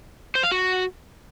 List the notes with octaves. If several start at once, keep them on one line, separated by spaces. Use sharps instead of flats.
C5
F5
F#4